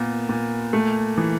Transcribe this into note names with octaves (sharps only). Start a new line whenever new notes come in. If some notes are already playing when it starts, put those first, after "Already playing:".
Already playing: A#2 B3
A#2
A3
E3